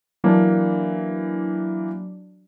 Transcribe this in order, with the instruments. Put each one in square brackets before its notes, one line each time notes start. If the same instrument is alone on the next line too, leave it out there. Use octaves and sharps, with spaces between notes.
[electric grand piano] E3 A#3 [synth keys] F#3 D4